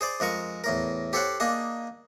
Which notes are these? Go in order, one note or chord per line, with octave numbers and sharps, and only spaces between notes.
G#4 C5 D5
F2 G#3 A#4 C#6
E2 A2 A#4
G4 A4 C5 C#5 F#5
A#3 D4 D#4 G#4